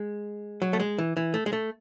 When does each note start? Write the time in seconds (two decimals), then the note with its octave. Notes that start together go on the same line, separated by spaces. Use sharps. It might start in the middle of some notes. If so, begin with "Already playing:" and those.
Already playing: G#3
0.62 F#3
0.73 A3
0.80 G#3
0.99 E3
1.17 E3
1.34 A3
1.46 G#3
1.53 A3